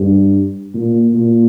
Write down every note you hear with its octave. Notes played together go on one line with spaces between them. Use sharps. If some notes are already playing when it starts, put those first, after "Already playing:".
Already playing: G2
A#2
A#2